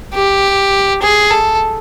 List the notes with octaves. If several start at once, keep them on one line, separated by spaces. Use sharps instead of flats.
G4
G#4
A4